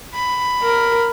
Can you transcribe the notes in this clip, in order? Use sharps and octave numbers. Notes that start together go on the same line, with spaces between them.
B5
A#4